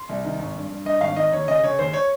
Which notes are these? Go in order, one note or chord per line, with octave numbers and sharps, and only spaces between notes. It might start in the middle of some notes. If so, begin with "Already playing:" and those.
Already playing: C6
C2
D#3
G#1
G2
G2
G2 D#5
G#1 F5
D#3 D#5
D#2 C#5
C#3 D#5
C#3 C#5
D#2 C5
C#5